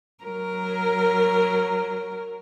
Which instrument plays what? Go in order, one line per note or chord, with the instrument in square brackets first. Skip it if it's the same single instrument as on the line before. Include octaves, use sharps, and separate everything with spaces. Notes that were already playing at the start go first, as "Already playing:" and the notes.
[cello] F#3 A#4